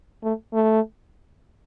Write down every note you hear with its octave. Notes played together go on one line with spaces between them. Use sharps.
A3
A3